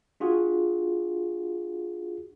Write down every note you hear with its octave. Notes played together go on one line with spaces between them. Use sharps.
D4 F4 F#4 G#4